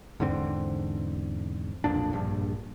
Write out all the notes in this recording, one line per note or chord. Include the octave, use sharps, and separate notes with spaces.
E2 G#2 D3 C4
B1 F2 A#2 D4
A#1 G2